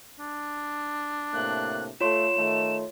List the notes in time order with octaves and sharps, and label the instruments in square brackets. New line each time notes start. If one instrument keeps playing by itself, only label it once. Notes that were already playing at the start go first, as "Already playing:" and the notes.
[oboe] D4
[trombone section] A2 C3 A#3 [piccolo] F#6
[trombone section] A3 [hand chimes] F4 C#5 C6 [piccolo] E7
[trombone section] D#3 A3